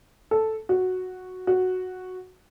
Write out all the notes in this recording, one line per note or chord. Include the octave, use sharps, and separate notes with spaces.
A4
F#4
F#4